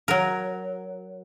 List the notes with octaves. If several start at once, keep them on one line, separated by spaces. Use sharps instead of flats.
F#3 A#4